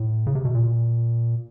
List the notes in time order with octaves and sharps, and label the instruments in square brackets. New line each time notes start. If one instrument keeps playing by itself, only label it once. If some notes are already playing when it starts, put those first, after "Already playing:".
Already playing: [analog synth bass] A2
C#3
C3
B2
A#2